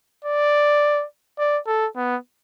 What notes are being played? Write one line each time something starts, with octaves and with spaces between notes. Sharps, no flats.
D5
D5
A4
B3